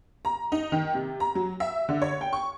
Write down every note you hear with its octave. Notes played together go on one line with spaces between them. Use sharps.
A#5
D#4
D#3
C3
A#5
F#3
E5
D3
C#5
G5
C#6